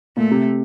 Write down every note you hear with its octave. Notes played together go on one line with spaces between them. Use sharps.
A#2 A3
C3